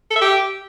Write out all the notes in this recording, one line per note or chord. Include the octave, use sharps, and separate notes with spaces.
A4
E5
G4